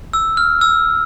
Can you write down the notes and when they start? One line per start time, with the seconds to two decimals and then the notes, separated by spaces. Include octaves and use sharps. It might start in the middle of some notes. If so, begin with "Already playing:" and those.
0.13 E6
0.37 F6
0.61 E6